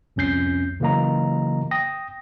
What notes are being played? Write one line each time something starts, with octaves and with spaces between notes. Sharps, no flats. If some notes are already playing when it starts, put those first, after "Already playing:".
C2 F2 C#4 G6 C7
C#3 E3 F#3 A#3 D#5 A#5
G5 D#6 A#6